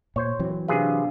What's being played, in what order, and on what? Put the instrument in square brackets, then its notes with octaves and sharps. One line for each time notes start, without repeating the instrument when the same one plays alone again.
[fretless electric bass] A#2 [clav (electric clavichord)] C5 C#5
[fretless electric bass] E3 F#3 C4
[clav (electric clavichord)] C3 G#4 B4 [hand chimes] D4 F5